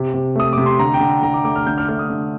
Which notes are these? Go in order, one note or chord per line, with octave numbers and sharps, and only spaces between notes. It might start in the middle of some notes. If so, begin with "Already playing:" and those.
Already playing: C3
C3
A3 D#6
C3 D6
C6
D3 A#5
G5
D3
D3 A#5
D6
A3 D6
F6
D3 G6
F6
A3 F6
D#6
D3